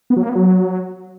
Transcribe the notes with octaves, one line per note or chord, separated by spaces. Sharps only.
B3
F#3
A#3
B3
F#3